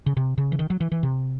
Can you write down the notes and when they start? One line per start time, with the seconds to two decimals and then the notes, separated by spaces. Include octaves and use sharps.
0.06 C#3
0.17 C3
0.38 C#3
0.52 E3
0.59 D#3
0.70 F#3
0.81 E3
0.92 E3
1.03 C3